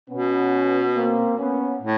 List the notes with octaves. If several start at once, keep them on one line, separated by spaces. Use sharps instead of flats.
B2 B3 C#4
A#3 C4
B3 C#4
A2